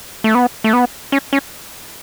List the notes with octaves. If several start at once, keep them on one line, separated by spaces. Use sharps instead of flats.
A3
B3
A3
B3
C#4
C#4